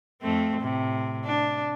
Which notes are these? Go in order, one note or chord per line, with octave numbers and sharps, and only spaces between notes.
F2 A3 C4
A2 C3
D4